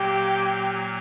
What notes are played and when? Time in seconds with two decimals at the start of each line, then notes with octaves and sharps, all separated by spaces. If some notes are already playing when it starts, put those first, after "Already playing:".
Already playing: A#2 F#3 A#3 G4